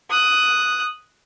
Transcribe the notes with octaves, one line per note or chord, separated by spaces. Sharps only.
D#6 F#6